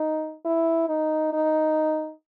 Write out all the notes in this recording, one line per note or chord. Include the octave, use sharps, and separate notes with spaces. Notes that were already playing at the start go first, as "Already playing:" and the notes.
Already playing: D#4
E4
D#4
D#4